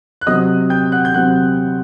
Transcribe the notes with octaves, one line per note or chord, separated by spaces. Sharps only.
F#6
C3 F#3 C4 D#5 D#6
G5 G6
F#5 F#6
G6
C3 F#3 C4 F#5 F#6